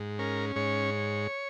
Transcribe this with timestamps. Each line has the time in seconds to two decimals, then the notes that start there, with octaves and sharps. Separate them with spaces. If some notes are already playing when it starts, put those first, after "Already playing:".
Already playing: G#2
0.19 C#4 A#4
0.56 G#2 C#5